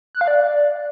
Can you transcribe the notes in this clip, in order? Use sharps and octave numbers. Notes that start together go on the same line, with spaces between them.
F#6
F5
D5